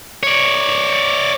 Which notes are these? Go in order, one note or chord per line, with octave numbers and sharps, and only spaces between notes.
C#5 D5